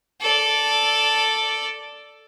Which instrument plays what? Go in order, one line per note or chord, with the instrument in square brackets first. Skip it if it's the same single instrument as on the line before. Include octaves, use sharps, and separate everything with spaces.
[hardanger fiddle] A4 D5